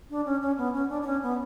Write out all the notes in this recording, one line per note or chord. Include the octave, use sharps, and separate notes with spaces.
D4
C#4
C#4
B3
C#4
D4
D4
C#4
B3